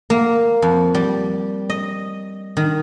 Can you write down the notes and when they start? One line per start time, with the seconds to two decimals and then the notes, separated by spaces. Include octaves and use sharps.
0.10 A#3
0.62 F2
0.95 G3
1.70 D#5
2.57 D#3